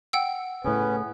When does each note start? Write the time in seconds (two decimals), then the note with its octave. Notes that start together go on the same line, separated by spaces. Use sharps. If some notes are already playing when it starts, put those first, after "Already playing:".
0.13 F#5 G5 E6
0.64 A2 C#3 B3 C#4 B4